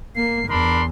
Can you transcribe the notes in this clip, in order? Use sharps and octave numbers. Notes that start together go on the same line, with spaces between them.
A#3 C7
E2 D4 A#4 B5 C6